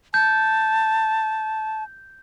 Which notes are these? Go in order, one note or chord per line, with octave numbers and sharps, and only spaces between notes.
A5 G6